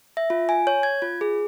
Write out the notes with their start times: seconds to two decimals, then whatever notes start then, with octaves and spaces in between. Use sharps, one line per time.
0.17 E5
0.30 F4
0.49 G#5
0.67 C#5
0.83 G#6
1.02 F4
1.21 G#4